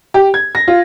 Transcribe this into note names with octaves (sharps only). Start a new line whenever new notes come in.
G4
G#6
A#6
F4